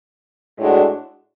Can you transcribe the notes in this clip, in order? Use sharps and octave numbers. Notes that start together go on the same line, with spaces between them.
A2 G#3 D4 F#4